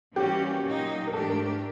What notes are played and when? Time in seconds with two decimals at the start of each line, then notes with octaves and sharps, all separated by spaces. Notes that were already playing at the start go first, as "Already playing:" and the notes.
0.15 E3 G3 A#3 C#4 F#4 G4
0.65 A#2 F#3 A#3 D#4
1.07 A#4
1.13 G#2 E3 A3 D4 G4 A4
1.29 A#4
1.46 A#4